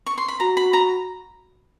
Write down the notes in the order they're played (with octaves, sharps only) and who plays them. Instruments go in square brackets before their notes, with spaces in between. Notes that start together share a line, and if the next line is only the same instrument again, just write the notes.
[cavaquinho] C#6
C6
B5
[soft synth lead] F#4 [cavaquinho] A#5
[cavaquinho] B5
A#5